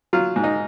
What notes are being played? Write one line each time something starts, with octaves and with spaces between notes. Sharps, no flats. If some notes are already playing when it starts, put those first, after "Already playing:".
F#3 F4
G#2
D#4